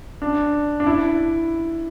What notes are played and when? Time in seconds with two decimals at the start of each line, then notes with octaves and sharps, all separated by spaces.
0.22 D4
0.80 D4
0.86 E4